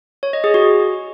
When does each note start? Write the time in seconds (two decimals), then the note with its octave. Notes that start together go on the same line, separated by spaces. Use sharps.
0.23 C#5
0.33 D#5
0.44 G#4
0.54 F#4